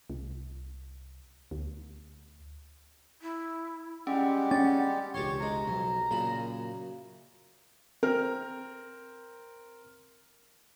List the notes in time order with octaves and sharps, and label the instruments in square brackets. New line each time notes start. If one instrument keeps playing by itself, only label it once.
[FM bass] C2
D2
[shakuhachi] E4
[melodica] G3 G#3 G4 [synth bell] C#4 [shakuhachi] F#5
[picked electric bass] C#4 [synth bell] A6
[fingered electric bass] E1 C#2 [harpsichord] G4 A5 C6 [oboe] C#5
[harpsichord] C3 G#3 [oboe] A#5
[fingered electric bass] B1 [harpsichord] F2
[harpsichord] F#2 C#3 B5 [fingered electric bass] A#2
[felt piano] C4 A#4 F6